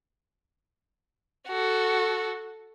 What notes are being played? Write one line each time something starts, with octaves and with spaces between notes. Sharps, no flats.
F#4 A4